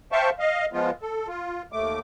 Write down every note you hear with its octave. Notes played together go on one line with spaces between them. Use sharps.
C5 E5 F5 G5 A5 C#6
D#5 F5
F3 G#3 B3 F4
A4
F4
D#2 A3 D6